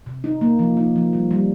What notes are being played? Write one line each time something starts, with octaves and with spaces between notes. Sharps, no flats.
C3
D#4
A#3
F3
D#4
F3
G3
G3